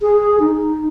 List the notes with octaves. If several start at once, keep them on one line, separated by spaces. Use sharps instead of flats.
G#4
D#4